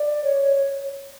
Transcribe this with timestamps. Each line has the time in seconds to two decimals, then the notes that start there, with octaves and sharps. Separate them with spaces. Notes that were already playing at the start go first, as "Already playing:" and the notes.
Already playing: D5
0.24 C#5